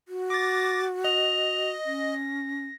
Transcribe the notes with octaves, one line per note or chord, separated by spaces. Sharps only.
F#4
D6 A6 A#6
D#5 F7
C#4 A#6